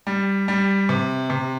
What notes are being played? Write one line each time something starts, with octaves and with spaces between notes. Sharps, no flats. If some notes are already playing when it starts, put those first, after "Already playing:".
G3
G3
C3
C3